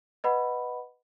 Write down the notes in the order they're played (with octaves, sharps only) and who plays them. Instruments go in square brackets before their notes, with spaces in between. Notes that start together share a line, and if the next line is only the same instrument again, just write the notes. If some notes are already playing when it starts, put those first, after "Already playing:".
[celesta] B4 D#5 F#5 B5